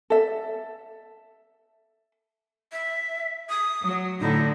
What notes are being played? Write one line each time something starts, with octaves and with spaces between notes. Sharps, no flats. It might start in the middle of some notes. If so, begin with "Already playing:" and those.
A4 E5
E5
D#6
F#3
A2 D3 D#4 E4